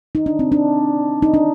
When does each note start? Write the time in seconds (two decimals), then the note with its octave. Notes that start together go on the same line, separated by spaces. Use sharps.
0.15 D#4
0.26 D4
0.39 C4
0.52 D4
1.22 D#4
1.34 D4